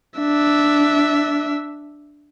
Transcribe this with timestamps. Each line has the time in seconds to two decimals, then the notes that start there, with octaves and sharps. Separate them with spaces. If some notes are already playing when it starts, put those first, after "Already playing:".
0.20 D4 E5